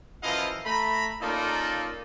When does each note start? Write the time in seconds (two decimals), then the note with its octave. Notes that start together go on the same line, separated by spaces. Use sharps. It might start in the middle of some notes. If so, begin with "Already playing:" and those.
0.23 F#2 E3 F3 E4 D#5 F5
0.65 A3 A#5 B5
1.21 A#3 C#4 D#4 F4 A4 D5